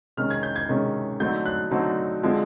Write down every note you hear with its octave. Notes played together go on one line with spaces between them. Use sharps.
C3 D#3 G#3 C#4 F6
G#6
G6
G#6
C3 D#3 G#3 C#4
D3 F#3 A3 C4 D#4 G6
F#6
D3 F#3 A3 C4 D#4
D3 F3 G#3 C4